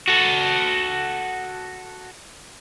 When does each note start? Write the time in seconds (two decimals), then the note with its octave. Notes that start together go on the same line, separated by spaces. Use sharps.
0.08 F#4 A4